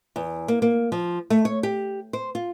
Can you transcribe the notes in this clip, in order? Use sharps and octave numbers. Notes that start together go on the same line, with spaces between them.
E2
A#3
A#3
F3
A3
C#5
G4
C5
F4